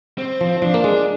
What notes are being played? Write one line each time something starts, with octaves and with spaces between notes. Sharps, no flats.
C4
F3
F3 D4
A#3
G#3